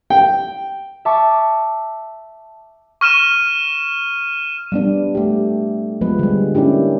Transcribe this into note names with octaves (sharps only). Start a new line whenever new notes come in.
G5
E5 A5 C#6 D6
C#6 F6 D#7 E7
G3 B3 D4
A3 G4
F3 G#3 B3 B4
D3 G3
A#3 C#4 D4 E4 G4